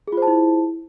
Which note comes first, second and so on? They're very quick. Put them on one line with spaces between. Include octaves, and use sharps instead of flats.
G#4 F4 C5 A5 E4